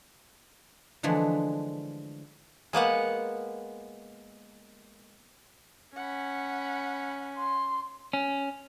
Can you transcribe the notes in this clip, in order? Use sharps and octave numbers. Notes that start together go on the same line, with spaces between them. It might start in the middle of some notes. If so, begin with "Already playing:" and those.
D3 E3 F3 G#3 A3
G#3 A#3 B3 F#5
C#4 F#5 B5
C6
C#4